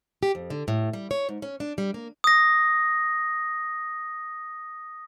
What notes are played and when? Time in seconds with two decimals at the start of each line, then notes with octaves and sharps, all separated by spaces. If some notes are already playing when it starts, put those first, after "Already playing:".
0.23 G4
0.35 F2
0.50 D3
0.68 A2
0.93 G3
1.11 C#5
1.29 G#2
1.42 C#4
1.60 D4
1.78 G3
1.94 A#3
2.24 D#6 A#6